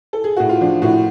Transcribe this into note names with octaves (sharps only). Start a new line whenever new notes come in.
A4
G#4
A2 F#4
F4
F3 D4
A2 F#4